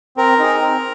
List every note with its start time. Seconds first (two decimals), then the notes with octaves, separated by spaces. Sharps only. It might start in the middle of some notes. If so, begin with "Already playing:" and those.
0.17 C4 A#4
0.39 D#4 G#4
0.60 C4